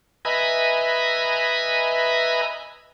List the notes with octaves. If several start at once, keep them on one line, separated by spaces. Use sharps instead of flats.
B4 D#5 E5 G#5 A#5 B5